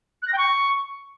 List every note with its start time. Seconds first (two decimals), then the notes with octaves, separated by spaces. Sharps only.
0.22 F#6
0.27 A#6
0.33 G5
0.38 C#6